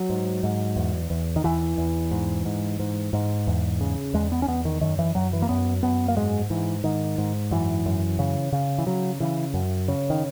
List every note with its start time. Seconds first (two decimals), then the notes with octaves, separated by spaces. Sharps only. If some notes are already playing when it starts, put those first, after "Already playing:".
Already playing: F#3
0.10 G#2
0.43 G#2
0.76 E2
1.10 E2
1.36 D#3
1.44 E2 E3
1.78 E2
2.11 G#2
2.45 G#2
2.79 G#2
3.13 G#2
3.47 E2
3.81 C#3
4.14 E2 G#3
4.32 B3
4.42 C#4
4.48 E2 B3
4.65 D#3
4.81 F#2 D#3
4.99 E3
5.15 F#2 F#3
5.33 E3
5.42 A#3
5.49 F#2 B3
5.83 F#2 B3
6.08 A#3
6.17 G#2 G#3
6.50 G#2 E3
6.84 G#2 D#3
7.18 G#2
7.51 F#2 E3
7.86 F#2
8.19 C#3
8.52 C#3
8.78 E3
8.87 C#3 F#3
9.20 C#3 E3
9.54 F#2
9.88 C#3
10.10 D#3